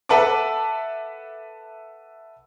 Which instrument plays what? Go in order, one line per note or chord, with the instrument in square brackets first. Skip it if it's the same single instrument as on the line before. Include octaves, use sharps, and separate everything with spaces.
[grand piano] A4 B4 E5 F#5 A5 D6